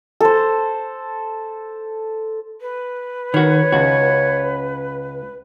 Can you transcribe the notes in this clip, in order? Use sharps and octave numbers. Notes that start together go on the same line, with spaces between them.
A4 C5
B4
D#3 F#4 C#5
C#2 F#4